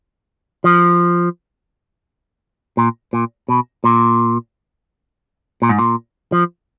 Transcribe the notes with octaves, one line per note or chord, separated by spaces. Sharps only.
F3
A#2
A#2
B2
A#2
A#2
G#2
A#2
F3